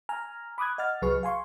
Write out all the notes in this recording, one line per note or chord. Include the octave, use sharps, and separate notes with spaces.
G#5 A#5 F6
B5 D6 D#6 F#6 G#6
D#5 F#5 F6 A6
C2 F#3 G#4 B4 C#6 F6
F5 G#5 C6 C#6